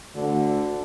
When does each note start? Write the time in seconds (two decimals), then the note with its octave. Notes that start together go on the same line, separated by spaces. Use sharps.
0.15 D2 D3